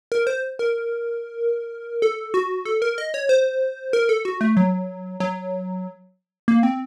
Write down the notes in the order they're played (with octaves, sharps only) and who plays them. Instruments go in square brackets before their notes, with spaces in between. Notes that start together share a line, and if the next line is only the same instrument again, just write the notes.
[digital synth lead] A#4
C5
A#4
A4
F#4
A4
A#4
D#5
C#5
C5
A#4
A4
F#4
A3
F#3
F#3
A#3
C4